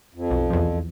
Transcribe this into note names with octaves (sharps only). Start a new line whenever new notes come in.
F2
B1
E2 F3